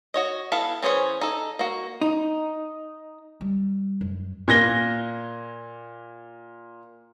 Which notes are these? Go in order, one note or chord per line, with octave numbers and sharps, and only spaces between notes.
F#4 C#5 D#5
B3 E4 A4 F5
E3 C#4 G#4 C5 C#5
D#4 A4
A#3 F#4
D#4
G3
F#2
A#2 G#6 A#6 G7